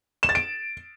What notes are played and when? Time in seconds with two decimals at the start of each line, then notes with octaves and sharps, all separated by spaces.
0.23 E7
0.29 A6
0.35 D7